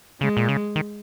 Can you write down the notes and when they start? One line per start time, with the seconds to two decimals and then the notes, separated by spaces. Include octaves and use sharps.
0.21 C#3 G#3
0.37 A#2
0.49 C#3
0.76 D#3